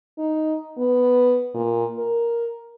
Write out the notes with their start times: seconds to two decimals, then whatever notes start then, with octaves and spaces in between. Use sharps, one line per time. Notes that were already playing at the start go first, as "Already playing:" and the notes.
0.18 D#4
0.78 B3
1.54 A#2
1.98 A#4